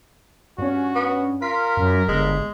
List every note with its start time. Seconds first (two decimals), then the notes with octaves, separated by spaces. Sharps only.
0.58 G2 C#4 F#4
0.95 B3
1.42 F4 A#4 B6
1.77 F#2
2.09 G1 G#3